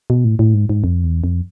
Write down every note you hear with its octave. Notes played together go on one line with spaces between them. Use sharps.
B2
A2
A2
G#2
G#2
F2
E2
F2